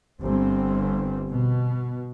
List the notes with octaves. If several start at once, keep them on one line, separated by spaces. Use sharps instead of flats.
G1 C4
B2